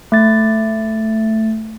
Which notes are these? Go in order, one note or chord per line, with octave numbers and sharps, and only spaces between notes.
A3 A6